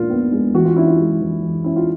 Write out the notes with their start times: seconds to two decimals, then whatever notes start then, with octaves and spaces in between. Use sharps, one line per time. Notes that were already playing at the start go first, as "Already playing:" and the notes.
Already playing: A#2 F3 G#3 B3 F4 A#4
0.10 B3
0.32 G#3
0.54 E3 F#4
0.65 F4
0.77 C#4 E4
0.87 F4
0.98 G#3
1.21 E3
1.43 E3
1.64 C#4 E4
1.76 F4